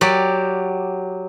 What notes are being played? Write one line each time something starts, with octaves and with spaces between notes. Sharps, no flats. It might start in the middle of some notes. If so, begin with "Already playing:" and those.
F#3 G4 D5